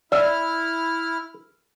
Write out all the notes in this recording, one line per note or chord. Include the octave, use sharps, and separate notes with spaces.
E4 D5 E5 F6